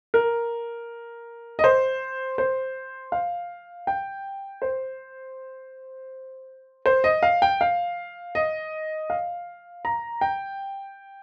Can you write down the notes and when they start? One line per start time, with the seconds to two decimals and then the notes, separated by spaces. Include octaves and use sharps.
0.14 A#4
1.59 D#5
1.64 C5
2.38 C5
3.12 F5
3.87 G5
4.62 C5
6.86 C5
7.04 D#5
7.23 F5
7.42 G5
7.61 F5
8.35 D#5
9.10 F5
9.85 A#5
10.21 G5